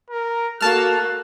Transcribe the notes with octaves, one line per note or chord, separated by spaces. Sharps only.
A#4
A#3 F#4 A4 A5 F6 F#6